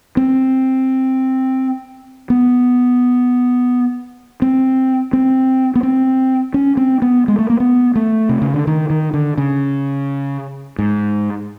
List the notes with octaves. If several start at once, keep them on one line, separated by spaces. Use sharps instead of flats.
C4
B3
C4
C4
B3
C4
C#4
C4
B3
G#3
A3
A#3
B3
A3
C3
C#3
D3
D#3
D#3
D3
C#3
G#2